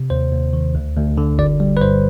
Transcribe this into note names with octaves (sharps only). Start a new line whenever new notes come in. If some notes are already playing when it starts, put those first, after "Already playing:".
Already playing: C3
D#2 C5
D#2
D#3
D2
D2
D3
G1 D5
G3
B4
G2 C5